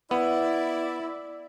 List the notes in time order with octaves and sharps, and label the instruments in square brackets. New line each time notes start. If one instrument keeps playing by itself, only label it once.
[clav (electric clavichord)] B3 [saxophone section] E4 [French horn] D5